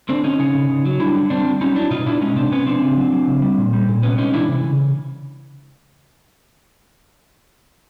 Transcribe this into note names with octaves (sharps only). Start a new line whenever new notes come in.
D3 C4 D4
D3 C#4 D#4
C#3 C#4 D#4
C#3
C#3
F#3
G3 D4 E4
D3
G3 C4 D4
G3
F#3 C#4 D#4
F#3 D4 E4
B2 D#4 F4
B2 D4 E4
G#3 C#4 D#4
C3 C4 D4
C3 B3 C#4
F3 C4 D4
C#3
F#3
F#3
C#3
G3
A#2
G3
A#2
C3 B3 C#4
G#3 C#4 D#4
E3 D4 E4
C3
C#3